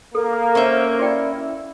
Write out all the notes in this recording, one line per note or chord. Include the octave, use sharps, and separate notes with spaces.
A#3 A4 A#4
C#4 C5 E5
E4 F#4 D5 G5